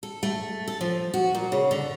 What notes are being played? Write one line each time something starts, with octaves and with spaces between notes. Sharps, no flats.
A4
A3
A4
F3
F#4
A#2
C#3
D3